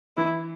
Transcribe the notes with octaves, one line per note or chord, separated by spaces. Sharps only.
E3 E4